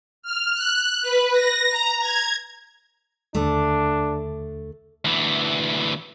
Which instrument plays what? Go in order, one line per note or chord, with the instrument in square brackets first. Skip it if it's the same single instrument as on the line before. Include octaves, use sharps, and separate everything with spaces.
[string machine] F6
F#6
B4
A#6
A#5
G#6
[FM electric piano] D#2 D3 [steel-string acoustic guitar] A3 [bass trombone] D4
[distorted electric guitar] D2 E3